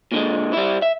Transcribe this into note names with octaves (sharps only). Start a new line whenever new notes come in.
A#2 D3 G#3
G3 E4
E5